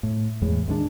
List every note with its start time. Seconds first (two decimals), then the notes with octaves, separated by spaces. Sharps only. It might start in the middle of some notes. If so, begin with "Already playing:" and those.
0.03 A2
0.42 E2 A2 G#3
0.68 D#2 G#3 A3 D4